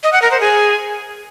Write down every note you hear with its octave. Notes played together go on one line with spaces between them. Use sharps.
D#5
F#5
A#4
C5
G#4